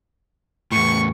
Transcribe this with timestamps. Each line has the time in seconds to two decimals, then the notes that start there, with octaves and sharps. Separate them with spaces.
0.72 E2 A2 C#6